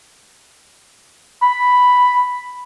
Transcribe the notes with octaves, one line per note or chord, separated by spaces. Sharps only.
B5